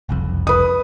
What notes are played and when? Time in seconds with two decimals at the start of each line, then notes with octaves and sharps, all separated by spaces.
0.09 F#1 C2 F2
0.47 B4 D#6